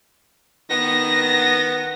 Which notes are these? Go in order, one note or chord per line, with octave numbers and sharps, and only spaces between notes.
D#3 B3 A#6